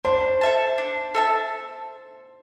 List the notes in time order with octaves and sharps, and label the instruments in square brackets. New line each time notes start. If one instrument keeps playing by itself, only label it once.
[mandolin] D4 [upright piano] C5
[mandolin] A4 E5 A5
D4
A4 E5 A5